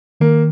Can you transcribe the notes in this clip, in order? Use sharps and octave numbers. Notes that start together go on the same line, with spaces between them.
D#3 A#3